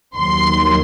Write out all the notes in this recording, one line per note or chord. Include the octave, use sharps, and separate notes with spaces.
D#2 D#3 F#3 C6